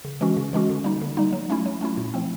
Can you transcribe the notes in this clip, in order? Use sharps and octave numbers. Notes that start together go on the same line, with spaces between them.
C#3
E3 G#3 C#4 F#4
C#3
E3 G#3 C#4 F#4
D3
G3 A#3 D#4
D3
G3 A#3 D#4
F#3
A3 C#4 E4
F#3
A3 C#4 E4
A#2
F3 A3 C4